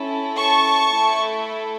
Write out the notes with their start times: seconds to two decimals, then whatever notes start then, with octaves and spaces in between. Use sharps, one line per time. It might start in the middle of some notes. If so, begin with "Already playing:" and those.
Already playing: C#4 E4 A4
0.38 A5 C#6
0.92 A3 E4 A4